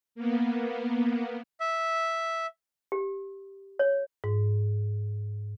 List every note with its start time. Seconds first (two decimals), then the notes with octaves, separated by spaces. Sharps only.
0.15 A#3 B3
1.60 E5
2.92 G4
3.79 C#5
4.24 G#2